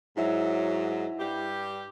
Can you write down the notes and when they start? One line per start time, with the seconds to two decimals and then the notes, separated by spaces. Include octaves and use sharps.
0.17 G#2 F#3 E4 E5
1.19 G2 G3 G4